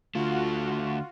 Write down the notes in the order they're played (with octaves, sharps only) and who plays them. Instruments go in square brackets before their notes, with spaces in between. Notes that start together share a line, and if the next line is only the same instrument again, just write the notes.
[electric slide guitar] D3 A3 [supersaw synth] F4 F#4